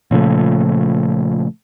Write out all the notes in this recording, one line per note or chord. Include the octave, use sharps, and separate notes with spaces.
A#2 C#3 F3 A3